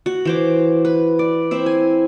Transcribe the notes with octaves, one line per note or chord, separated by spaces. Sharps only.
F#4
E3 C5 D6
B4
D5
C4 E4 C5
G#5